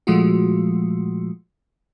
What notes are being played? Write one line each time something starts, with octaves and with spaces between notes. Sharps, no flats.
A#2 F3 G#3 A3 F4 F#4